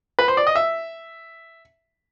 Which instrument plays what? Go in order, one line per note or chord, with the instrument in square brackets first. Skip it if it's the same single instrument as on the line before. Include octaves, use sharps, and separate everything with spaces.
[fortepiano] B4
C5
D5
D#5
E5